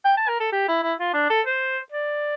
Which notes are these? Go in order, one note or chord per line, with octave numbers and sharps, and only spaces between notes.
G5
A5
A#4
A4
G4
E4
E4
F4
D4
A4
C5
D5